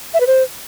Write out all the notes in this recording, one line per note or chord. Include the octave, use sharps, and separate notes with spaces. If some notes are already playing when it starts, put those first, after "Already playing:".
E5
B4
C5